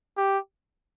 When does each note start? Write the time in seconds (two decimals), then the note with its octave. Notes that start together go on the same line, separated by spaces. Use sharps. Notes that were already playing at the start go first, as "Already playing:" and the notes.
0.17 G4